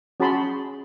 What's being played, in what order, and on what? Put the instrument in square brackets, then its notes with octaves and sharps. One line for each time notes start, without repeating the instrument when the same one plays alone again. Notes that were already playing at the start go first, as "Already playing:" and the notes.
[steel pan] C#4 F#4 G#4 A5 B5 C6